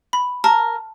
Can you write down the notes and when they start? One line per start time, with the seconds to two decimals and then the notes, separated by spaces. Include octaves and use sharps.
0.13 B5
0.44 A#4 A5